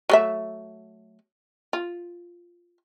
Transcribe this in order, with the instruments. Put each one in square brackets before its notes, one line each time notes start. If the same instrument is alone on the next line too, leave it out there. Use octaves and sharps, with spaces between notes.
[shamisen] F#3 A3 E5
F4